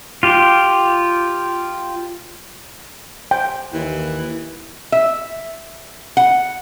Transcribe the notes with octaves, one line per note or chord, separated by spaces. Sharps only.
F4 G4
G5
D#2 E3
E5
F#5